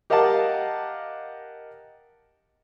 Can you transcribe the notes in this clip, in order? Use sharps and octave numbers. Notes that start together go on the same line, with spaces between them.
G4 A#4 D#5 F5 F#5 A5